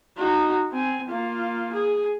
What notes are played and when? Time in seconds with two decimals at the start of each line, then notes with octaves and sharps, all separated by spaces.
0.17 D#4 F#4
0.72 C4 G#5
1.08 A#3 F4
1.73 G#4